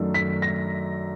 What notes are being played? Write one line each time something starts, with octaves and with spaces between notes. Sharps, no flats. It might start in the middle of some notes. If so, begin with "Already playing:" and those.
Already playing: F#2 D#3 F#3 A3 D4
B6
A#6